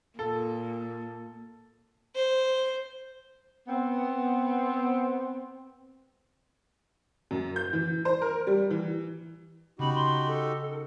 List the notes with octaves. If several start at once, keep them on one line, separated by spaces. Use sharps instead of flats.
A#2 A4
C5
B3 C4
F#2
G6
E3
C5
A#4
G3
E3
C#3 C#4 D#4 F#4 G4 B5
C6
A4